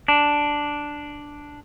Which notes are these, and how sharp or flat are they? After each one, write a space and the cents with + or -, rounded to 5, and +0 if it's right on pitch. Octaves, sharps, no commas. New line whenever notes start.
D4 +0